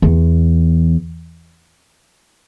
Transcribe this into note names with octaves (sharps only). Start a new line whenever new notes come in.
E2